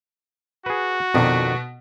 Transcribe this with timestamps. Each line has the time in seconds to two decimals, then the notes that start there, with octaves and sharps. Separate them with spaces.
0.66 F#4 G#4 B4
1.14 F2 B2 D#3 D4